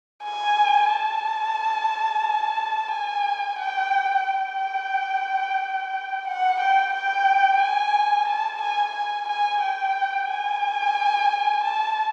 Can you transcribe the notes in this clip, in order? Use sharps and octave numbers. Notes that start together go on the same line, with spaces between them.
G#5
A5
G#5
G5
G5
F#5
G5
G5
G#5
A5
G#5
G#5
G#5
G5
G#5
A5